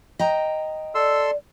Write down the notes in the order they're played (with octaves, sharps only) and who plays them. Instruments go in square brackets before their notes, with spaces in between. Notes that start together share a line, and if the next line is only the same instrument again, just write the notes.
[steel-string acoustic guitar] D#5 G5 A#5
[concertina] A4 C6 E6 [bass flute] D5